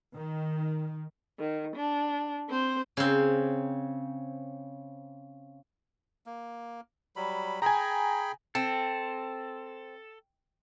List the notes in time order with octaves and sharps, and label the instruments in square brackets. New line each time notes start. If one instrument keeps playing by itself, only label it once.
[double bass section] D#3
[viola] D#3
D4
C4 C5
[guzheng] C#3 C4
[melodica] A#3
F#3 G3 B5
[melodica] G#4 G5 B5 [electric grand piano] G#5 A#5
[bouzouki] C4 [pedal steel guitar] A4